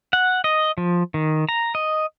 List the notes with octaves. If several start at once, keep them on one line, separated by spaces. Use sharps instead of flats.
F#5
D#5
F3
D#3
A#5
D#5